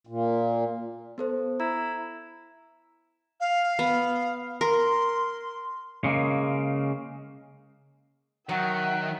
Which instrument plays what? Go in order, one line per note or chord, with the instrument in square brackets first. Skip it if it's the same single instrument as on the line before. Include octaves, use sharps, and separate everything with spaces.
[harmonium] A#2
[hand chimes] B3 A4 C5
[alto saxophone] E4 [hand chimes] A#5
[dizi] F5
[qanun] B3
[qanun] A#4 [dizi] C6
[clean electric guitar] C#3 G#3 A#3
[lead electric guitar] D#3 [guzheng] F#3 [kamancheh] E5 G5 [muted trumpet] F#5